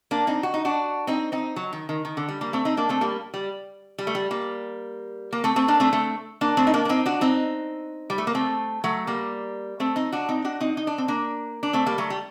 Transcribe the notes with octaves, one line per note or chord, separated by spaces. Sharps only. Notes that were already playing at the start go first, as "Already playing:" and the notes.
A#3 D4
C4 D#4
F#4
D#4
D4 F#4
C4 D#4
C4 D#4
F#3
D#3
D#3
D#3
D3
G3
G3 A#3
A3 C4
C4 D#4
A#3 D4
A3 C4
G3 A#3
G3
G3
A3
G3
G3 A#3
A#3
A3 C4
A3 C4
A#3 D4
A3 C4
A3 C4
A#3 D4
A3 C4
D#4
A#3 D4
D4
C4 D#4
D4 F#4
C4 D#4
G3
A3
A#3
A3 C4
F#3 A3
G3 A#3
A3 C4
C4 D#4
D4 F#4
C4 D#4
D4 F#4
C4 D#4
D#4
D4
C4
A#3 D4
D4
A3 C4
G3 A#3
F#3 A3
G3